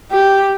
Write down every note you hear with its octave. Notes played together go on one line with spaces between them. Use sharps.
G4